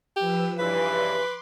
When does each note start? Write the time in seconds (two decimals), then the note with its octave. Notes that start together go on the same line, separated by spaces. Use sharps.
0.16 F3 G4 B4 E6
0.59 G2 C#3 E3 B4 C6 D6